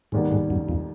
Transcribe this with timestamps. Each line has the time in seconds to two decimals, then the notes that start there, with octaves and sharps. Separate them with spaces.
0.12 F1 D#2 G#2 D#3 G3 B3
0.31 G#2
0.50 F#2
0.69 F2